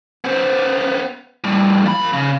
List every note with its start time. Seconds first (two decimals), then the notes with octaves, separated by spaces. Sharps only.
0.24 B3 C5
1.44 A2 G3
1.86 F3 B5
2.13 C#3